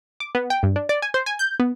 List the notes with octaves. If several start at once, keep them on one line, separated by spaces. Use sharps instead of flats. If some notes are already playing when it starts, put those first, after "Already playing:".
D6
B3
G5
G2
D4
D5
G#5
C5
G#5
G6
B3